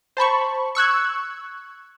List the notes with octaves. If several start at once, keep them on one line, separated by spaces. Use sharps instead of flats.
C5 A5 B5 C#6
C#6 E6 F#6 G#6